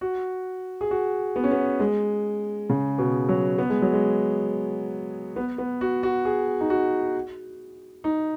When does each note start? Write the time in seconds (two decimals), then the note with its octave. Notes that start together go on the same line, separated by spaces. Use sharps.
0.01 F#4
0.81 G#4
0.91 F#4
1.36 B3
1.44 C#4
1.51 B3
1.80 G#3
2.69 C#3
2.98 B2
3.29 F#3
3.58 B3
3.70 G#3
3.82 F#3
3.94 G#3
5.36 B3
5.58 B3
5.81 F#4
6.03 F#4
6.25 G#4
6.60 D#4
6.70 F#4
8.04 D#4